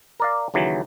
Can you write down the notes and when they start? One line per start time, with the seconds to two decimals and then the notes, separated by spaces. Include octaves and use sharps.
0.20 A#4 D5 F5
0.54 D#2 C#3 E3 F#3